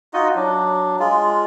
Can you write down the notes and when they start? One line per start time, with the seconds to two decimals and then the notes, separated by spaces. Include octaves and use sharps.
0.14 D#4 F4 F#4 D#5
0.35 F#3 D4
0.99 G#3 F4